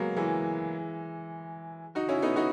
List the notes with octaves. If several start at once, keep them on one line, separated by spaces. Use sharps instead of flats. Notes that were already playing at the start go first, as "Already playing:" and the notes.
Already playing: F#3 G#3 A#3 B3
E3 G#3
D#4 F#4
C#4 E4
B3 D#4
D#4 F#4